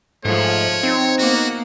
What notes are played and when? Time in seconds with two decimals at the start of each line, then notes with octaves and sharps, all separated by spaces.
0.25 G#2 F3 A3 C#5
0.83 C4 D#4
1.18 A#3 B3 F#4